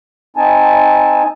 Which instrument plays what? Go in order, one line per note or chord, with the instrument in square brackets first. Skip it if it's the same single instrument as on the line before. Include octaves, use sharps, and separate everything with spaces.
[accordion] C4 D#4 G#5 A5